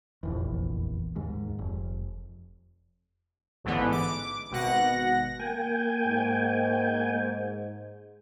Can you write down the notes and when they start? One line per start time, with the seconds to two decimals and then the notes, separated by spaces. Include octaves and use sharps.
0.23 F1 A#1 E2
1.16 D#2 G#2
1.59 F1
3.64 A1 G#2 D3 E3 B3
3.92 D6
4.51 G#1 B2 F#5 A#6
5.39 A#3 G5 G#5
6.06 G#2